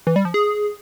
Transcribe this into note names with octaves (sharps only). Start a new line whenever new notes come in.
E3
G3
F3
G#4